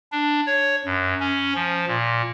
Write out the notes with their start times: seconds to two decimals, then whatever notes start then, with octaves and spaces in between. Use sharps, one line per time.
0.12 D4
0.47 C#5
0.85 F#2
1.20 C#4
1.55 F3
1.87 A#2